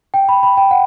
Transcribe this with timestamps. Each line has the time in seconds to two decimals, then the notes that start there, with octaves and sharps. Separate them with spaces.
0.14 G5
0.29 B5
0.43 B5
0.57 G5
0.71 F#5